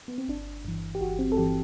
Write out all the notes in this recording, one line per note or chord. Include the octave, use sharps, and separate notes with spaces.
B3
C4
G1 D4
G2 E3
G4
G1 F#4
C4
A4
G2 E3 G4